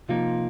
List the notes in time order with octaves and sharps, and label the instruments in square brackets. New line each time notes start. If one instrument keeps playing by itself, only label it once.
[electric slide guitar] C3 F3 A#3 D#4 [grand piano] F4